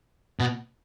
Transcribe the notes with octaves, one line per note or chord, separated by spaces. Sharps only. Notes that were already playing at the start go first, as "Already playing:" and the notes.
B2